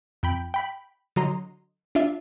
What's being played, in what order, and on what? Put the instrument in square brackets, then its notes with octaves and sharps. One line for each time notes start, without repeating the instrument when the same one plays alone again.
[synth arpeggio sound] F2 G5 B5
G5 B5
D3 F#3 D#5 A#5 C6
D4 F4 E5